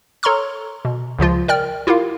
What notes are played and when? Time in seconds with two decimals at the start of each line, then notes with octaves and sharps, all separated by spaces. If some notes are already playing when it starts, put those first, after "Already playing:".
0.23 A4 C#5 A#5 C6 C#6 F6
0.85 B2
1.19 C#2 C#3 F3 F4
1.48 A#4 D5 G5 F6
1.87 E4 F4 G4 A#4 F5